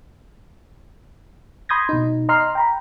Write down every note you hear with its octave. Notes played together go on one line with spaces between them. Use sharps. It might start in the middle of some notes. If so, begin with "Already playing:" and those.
B5 C6 D#6 G6 G#6 A#6
B2 D#4
D#5 A#5 C6 F6 C7
G5 A#5 B5